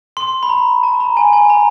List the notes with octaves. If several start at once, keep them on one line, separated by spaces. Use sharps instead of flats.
C6
B5
A#5
A5
A#5
G#5
G#5
A#5